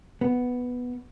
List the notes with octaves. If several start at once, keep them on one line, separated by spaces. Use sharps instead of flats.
B3